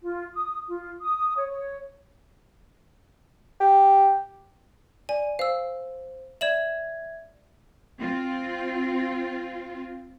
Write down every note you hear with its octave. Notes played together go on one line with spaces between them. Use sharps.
F4
D#6
F4
D#6
C#5
C#5
G4
D5 G#5
C5 F5 E6
D5 E5 G#6 E7 F#7
C4 F4